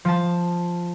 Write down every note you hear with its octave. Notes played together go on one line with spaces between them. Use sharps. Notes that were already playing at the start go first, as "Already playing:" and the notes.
F3 A5